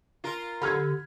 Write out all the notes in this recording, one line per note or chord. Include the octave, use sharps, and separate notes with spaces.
F4 A#4
D3 G4 B5 F6 G#6